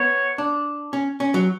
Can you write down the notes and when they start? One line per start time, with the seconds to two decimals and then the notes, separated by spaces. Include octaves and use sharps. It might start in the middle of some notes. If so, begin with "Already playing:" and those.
Already playing: B3 C#5
0.38 D4
0.93 C#4
1.20 C#4
1.34 F#3